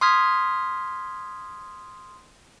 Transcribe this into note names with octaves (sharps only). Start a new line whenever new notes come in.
C6 D#6 F6 G#6 B6